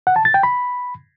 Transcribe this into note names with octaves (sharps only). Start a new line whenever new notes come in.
F#5
A5
A6
G5
B5